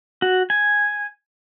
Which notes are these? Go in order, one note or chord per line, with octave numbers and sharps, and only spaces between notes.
F#4
G#5